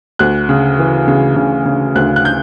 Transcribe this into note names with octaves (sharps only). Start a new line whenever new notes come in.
D2 F#6
C#3
E3
C#3
C#3
C#3
D2 F#6
F#6
G6